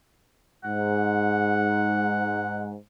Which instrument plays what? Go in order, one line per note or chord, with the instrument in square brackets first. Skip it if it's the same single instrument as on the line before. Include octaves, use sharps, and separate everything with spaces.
[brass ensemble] G#2 [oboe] F#5